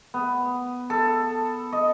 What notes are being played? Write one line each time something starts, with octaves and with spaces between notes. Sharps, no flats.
B3
A4
D#5